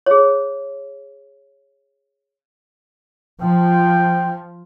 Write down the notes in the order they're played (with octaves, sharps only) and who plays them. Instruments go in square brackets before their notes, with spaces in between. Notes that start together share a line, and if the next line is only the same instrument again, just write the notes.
[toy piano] G#4 C#5
[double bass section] F3 [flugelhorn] G5